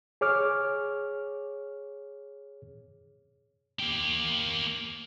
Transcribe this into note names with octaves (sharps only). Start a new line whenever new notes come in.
G#4 C#5 D6 F6
A#3 G4